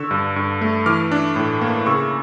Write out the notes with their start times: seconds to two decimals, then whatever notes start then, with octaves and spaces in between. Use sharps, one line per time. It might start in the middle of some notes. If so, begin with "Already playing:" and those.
Already playing: D3 C#6 E6
0.11 G2
0.36 G2
0.61 A3
0.86 E3 D6 F6
1.12 D4
1.36 A2
1.61 A#3
1.86 C#3 C#6 E6